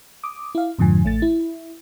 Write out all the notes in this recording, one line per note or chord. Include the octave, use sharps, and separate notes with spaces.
D6 D#6
E4 F5
F2 G#2 D3 F3 G#5
A1 A3 A6
E4